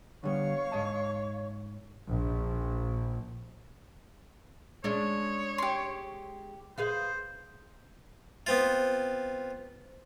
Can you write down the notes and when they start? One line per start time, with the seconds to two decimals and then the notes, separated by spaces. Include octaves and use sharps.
0.24 D3 G3 B3 C#5 F5 C#6
0.72 G#2 D#5 A5
2.08 A#1
4.84 G#3 C#4 D4 C#5
5.58 G4 C6
6.78 G#4 B4 C5 F5
8.47 B3 C4 F4